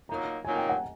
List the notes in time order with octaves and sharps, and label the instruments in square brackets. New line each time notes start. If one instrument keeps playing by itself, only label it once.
[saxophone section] A#2 F#3 A#3 D#4 [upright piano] A#5
[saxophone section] A#2 F#3 A#3 D#4 [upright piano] G#5
[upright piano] G5
F#5